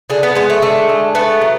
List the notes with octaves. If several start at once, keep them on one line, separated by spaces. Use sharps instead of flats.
D3 G#4
B3
G#3 B3
A3
D3 A3
G#3
A3 B3
F#3